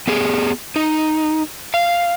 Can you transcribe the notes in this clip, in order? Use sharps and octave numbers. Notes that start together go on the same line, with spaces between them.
B3 G4 G#4
D#4
F5